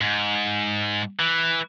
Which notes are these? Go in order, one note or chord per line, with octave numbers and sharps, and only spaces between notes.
G#2
E3